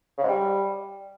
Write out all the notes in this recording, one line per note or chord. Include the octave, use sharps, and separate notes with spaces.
C#3
G#2
G3